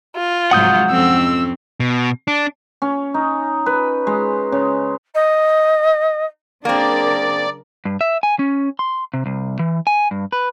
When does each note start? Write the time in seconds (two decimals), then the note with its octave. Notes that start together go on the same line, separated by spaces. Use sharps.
0.16 F4
0.51 G#2 C3 F3 F#3 F#5 D#6 G6
0.91 F2 C4 C#4 E6
1.80 B2
2.28 D4
2.82 C#4
3.14 D#4
3.66 B4
4.07 G#3
4.52 C#3
5.14 D#5
6.65 C#3 F#3 A#3 C4 D4 G#4 A#4 D5
7.85 G2
8.01 E5
8.23 G#5
8.39 C#4
8.79 C6
9.14 C3
9.26 C2
9.59 E3
9.87 G#5
10.11 G2
10.33 B4